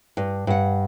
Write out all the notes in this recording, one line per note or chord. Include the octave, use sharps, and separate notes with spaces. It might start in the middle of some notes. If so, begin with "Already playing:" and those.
G2
G2 F#5